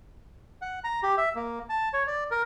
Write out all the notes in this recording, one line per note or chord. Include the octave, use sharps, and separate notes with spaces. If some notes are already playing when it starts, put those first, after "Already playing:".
F#5
A#5
G4
E5
A#3
A5
C#5
D5
A#4